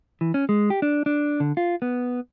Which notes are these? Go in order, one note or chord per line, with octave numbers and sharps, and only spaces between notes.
E3
C#4
G#3
G4
D4
D4
D3
F4
B3